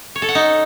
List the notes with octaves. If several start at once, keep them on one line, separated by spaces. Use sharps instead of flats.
C#5
A4
F#5
D#4